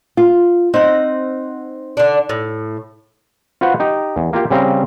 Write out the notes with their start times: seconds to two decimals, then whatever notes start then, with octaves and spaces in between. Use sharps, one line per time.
0.17 F4
0.74 C4 D#4 F#5
1.97 D3 D4
2.29 A2
3.61 F4 F#4 B4 C5 F5 F#5
3.80 D#4 G4
4.16 E2
4.33 A#3 F4 G4 F5
4.50 C#3 G3 C4 C5 F5 A#5